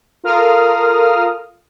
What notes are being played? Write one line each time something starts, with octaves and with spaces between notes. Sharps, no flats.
F4 A4 A#4 F5 D#6 F6